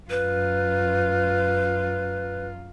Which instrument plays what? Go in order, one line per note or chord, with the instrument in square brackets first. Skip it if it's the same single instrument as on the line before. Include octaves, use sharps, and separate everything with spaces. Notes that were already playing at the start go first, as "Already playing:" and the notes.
[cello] F#2 F4 [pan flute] B4